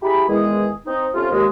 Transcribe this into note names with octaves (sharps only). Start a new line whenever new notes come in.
E4 G4 G#4 A#5 B5
E2 D#3 G#3 G#4
C4 D#4
C3 A3 C4 C#4 F4
D#2 G#3